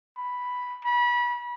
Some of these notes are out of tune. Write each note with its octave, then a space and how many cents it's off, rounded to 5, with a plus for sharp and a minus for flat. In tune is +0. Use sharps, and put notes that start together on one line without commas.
B5 +0
B5 -30